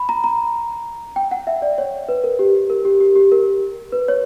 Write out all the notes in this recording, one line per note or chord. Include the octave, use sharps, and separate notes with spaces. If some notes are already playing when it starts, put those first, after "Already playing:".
Already playing: B5
A#5
A#5
G5
F#5
E5
D5
C#5
B4
A#4
G4
A#4
G4
G4
G4
A#4
B4
C#5